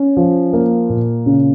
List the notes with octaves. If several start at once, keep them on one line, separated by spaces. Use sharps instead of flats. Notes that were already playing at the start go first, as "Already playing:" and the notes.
Already playing: C#4
F3
A#3
A#2
C#3